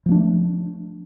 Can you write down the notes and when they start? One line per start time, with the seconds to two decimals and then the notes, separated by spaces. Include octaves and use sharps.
0.06 F3
0.09 A#3
0.12 D4
0.14 A3